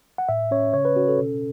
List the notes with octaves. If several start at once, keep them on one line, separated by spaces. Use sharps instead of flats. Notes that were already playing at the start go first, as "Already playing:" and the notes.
F#5
A2 E5
C#4 C#5
C#3 C#5
B4
C#4 F#4
A4
B2